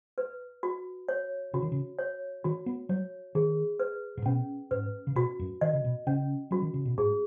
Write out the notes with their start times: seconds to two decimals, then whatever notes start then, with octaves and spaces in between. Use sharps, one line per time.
0.18 B4
0.63 F#4
1.08 C#5
1.53 C#3 F#4
1.62 D#3
1.72 C#3
1.99 C#5
2.44 D#3 F#4
2.66 B3
2.89 F#3 C#5
3.35 D#3 G#4
3.80 B4
4.17 G#2
4.26 B2 C#4
4.71 G#2 B4
5.07 C#3
5.16 B2 F#4
5.39 F#2
5.61 D#3 D#5
5.73 C#3
5.84 B2
6.07 C#3 C#4
6.51 F#3 F#4
6.62 D#3
6.74 C#3
6.85 B2
6.98 G#2 G#4